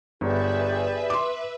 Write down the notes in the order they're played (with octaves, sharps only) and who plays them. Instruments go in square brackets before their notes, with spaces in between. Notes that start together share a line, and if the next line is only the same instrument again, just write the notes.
[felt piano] G1 [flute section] G4 G#4 D5 [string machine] B4 E5
[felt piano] C6 D6